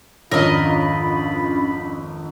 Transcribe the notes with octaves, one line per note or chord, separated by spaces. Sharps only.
G#1 F2 C#4 D4 F4 A#4 D#5 B5